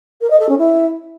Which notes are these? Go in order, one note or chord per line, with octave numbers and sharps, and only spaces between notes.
A#4
D#5
A4
C#4
E4